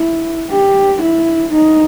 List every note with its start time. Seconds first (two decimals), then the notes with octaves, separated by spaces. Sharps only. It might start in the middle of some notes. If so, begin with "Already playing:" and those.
Already playing: E4
0.50 G4
1.02 E4
1.54 D#4